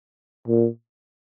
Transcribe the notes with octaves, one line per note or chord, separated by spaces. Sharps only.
A#2